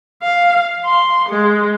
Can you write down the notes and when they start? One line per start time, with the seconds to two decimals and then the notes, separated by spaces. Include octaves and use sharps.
0.23 F5
0.84 C6
1.30 G#3